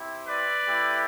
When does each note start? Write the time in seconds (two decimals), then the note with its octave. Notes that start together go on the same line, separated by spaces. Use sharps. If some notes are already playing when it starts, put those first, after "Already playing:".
Already playing: C4 E4 G4
0.28 B4 D5
0.68 A3 E4 G4